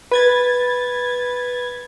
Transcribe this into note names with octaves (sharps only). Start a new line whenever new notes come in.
B4 G#6 A6